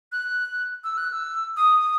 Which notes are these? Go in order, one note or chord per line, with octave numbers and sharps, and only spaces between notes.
F#6
E6
F#6
E6
D#6